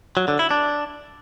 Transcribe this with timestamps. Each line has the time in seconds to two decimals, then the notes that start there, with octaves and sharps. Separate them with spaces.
0.17 F#3
0.28 D3
0.39 E4
0.51 D4